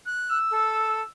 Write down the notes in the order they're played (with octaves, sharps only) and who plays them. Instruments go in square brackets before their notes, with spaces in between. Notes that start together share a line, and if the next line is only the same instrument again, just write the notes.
[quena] F#6
[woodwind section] E6
[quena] A4